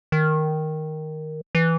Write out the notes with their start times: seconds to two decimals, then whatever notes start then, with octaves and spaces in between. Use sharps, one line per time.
0.12 D#3
1.55 E3